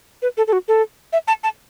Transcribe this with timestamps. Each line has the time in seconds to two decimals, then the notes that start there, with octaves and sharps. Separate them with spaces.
0.22 B4
0.37 A4
0.47 A4
0.53 F#4
0.68 A4
1.13 E5
1.28 A5
1.43 A5